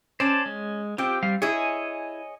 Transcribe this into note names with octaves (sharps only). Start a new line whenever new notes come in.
C#4 C5 D5 A5
G#3
C4 F4 G4 G5
G3 F5
E4 G#4 C#5 D#5 G#5